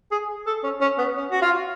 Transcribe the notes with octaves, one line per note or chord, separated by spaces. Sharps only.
G#4
A4
C#4
C#4
B3
C#4
F#4
F4